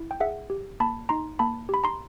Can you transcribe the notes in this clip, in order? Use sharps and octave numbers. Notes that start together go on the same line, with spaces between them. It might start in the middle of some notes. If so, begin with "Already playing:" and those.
Already playing: E4
G5
G#4 E5 F#5
G4
A#3 A5 B5
D#4 A#5 C6
A#3 A5 B5
G4 B5
A#5 C6